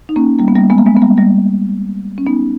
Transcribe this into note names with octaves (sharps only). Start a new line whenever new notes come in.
D#4
A#3 C#4
G3 A#3
B3
G3 A#3
G#3 B3
A#3
G#3 B3
B3
G3 A#3
G3 A#3
C#4
B3 D#4